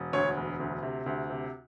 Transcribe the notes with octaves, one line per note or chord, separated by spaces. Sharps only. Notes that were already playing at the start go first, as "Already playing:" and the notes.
Already playing: E1
D2 C#5
E1
D2
C3
D2
C3